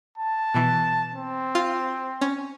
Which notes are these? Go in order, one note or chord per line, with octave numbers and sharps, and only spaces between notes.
A5
B2 E3
C4
F4
C#4